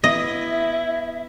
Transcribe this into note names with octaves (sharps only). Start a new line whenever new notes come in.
B3 E4 D#5 E5